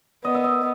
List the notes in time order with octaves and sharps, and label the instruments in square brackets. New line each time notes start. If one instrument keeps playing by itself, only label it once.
[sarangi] B3 [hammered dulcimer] D#5
[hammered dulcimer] E5
D#5